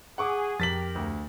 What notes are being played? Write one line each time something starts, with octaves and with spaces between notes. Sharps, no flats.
G#4 F#5 C#6 D6
F2 G4 A#4 A6 B6 F#7
D2